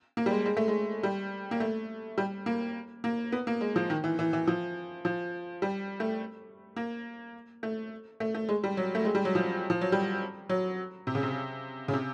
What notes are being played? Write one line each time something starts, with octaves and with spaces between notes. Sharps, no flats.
A#3
G3
G#3
G#3
A3
G#3
G3
A#3
A3
G3
A#3
A#3
B3
A#3
G#3
F3
D#3
E3
E3
E3
F3
F3
G3
A3
A#3
A3
A3
A3
G#3
G3
F#3
A3
G#3
G3
F#3
F3
F3
F#3
G3
F#3
C3
C#3
C3
C#3
C3